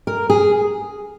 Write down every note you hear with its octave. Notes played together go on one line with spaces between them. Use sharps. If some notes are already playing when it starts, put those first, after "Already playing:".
A#4
G#4